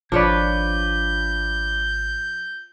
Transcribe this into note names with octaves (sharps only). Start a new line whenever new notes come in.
G#1 F3 D4 B4 C#5 D5 G6